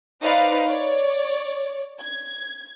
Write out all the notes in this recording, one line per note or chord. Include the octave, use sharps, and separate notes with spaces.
D#4 B4 C5 D5 F5
C#5 D5
G#6